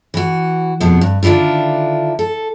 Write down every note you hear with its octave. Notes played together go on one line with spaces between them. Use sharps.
E3 F#4
F2 B2 G#3 B3
G2
D3 D#3 D4 E4 F4
A4